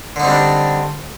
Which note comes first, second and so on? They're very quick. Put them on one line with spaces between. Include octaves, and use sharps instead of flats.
D3 D#4 C4 G3 D4